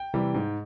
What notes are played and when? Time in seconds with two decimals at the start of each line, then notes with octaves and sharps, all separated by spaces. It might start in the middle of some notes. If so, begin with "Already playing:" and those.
Already playing: G5
0.14 C3 E3 G3
0.34 G#2